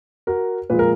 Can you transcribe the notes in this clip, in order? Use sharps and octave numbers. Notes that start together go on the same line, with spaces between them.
F#4 A#4
A#2 F3 G#3 B4
A#4